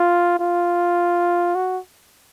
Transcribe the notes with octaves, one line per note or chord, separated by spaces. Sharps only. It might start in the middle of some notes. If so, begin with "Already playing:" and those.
Already playing: F4
F4
F#4